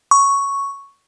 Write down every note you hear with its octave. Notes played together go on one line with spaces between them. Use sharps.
C#6